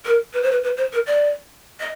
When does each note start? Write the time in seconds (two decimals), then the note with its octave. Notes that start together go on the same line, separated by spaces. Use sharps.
0.05 A#4
0.34 B4
0.42 C5
0.51 B4
0.63 B4
0.77 C5
0.92 A#4
1.07 D5
1.80 D#5